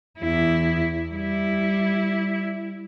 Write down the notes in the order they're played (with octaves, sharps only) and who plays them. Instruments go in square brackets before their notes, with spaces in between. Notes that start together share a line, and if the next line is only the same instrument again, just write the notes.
[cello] E2 E4
G3 E4